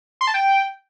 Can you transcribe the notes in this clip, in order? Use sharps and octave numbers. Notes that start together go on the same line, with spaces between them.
C6
A5
G5